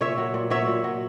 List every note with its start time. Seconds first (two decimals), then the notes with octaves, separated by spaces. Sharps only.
0.01 A#2 C#5 E5
0.18 F#3
0.34 A#2
0.50 F#3 C#5 E5
0.68 A#2
0.84 F#3